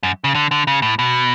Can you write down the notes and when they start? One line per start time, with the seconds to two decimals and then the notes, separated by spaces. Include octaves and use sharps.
0.03 F#2
0.24 C#3
0.35 D3
0.51 D3
0.67 C#3
0.82 A2
0.99 B2